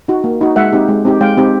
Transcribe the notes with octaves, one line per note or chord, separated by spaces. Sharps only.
D#4 F#4
A#3
D#4 F#4
G#3 E5 F#5
C4 D#4 G4
G#3
C4 D#4 G4
G#3 F5 G5
C4 D#4 G4